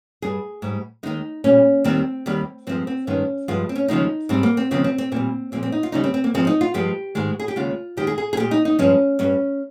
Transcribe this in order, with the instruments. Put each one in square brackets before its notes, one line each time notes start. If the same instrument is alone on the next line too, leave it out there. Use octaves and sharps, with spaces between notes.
[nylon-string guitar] G2 G3 G#4
G#2 G3
D#2 D#3 G#3 D#4
A#2 G3 C#4
D#2 D#3 G3 C4
D#2 D#3 G3
G2 F3 G#3 C4
C4
G2 D#3 G#3 C#4
G2 F3 G#3 F4
C4
C#4
D#2 C#3 F3 G#3 D#4
G#2 G3 C4
A#3
C4
D#2 C#3 F3 G#3 C4
C4
C4
A#2 G3 C4
A#2 F3 G#3 C4
C4
D#4
F4
D#2 C#3 G3 D#4
C4
C4
A#3
G#2 F3 G#3 C4
D#4
F4
G2 F3 G#3 G4
G#2 D#3 G#3
G#4
G4
D#2 C#3 G#3 F4
D#2 D#3 G#3 G4
G#4
G#4
G#4
A#2 G#3 G4
D#4
D#4
G2 F3 G#3 C#4
G2 G3 C#4